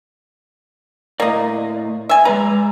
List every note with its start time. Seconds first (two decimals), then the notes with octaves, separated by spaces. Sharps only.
1.20 A2 A#3 D5 D#5
2.09 E5 G#5
2.25 G#3 B4 D5 A#5